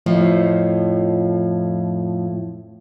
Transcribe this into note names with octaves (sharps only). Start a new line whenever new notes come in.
F2 A2 F3